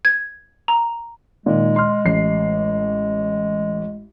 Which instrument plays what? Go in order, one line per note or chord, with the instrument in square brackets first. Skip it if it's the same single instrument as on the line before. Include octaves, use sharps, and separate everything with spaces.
[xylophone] G#6
A#5
[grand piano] A#2 D#3 [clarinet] G#3
[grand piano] C6 F6
A1 C7